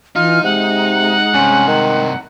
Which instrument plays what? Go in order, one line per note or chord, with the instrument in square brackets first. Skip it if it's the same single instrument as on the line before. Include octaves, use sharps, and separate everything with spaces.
[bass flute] E3 [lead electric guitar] D#4 [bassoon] F4 [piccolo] F6
[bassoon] C3 [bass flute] G#3 [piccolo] F#5
[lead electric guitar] G2 C3 [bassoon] C#4
[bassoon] D#3